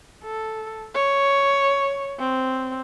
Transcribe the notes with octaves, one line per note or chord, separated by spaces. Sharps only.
A4
C#5
C4